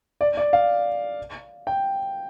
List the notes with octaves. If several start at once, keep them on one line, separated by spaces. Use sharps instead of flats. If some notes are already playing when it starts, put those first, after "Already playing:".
D5
D5
F5
G5